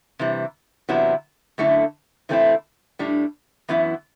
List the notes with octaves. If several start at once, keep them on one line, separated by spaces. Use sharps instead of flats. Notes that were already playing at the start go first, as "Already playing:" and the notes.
C3 E3 G3
E2 C3 F#3 B3 E4
F#2 D3 A3 E4 A4
C3 E3 A3 C4 E4
A2 G3 D4
F#2 E3 B3 E4